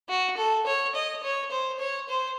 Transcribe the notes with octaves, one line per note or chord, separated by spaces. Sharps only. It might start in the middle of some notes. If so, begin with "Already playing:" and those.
F#4
A4
C#5
D#5
C#5
C5
C#5
C5